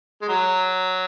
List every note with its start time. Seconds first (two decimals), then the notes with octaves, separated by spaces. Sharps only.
0.22 G#3
0.29 F#3